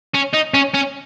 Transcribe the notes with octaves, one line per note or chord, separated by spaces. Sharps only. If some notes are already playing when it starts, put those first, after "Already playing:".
C#4
D#4
C#4
C#4